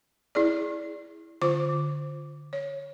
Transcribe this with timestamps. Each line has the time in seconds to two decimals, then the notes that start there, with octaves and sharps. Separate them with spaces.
0.35 E4 G#4 D5
1.42 D3 F4 C5 D6
2.53 C#5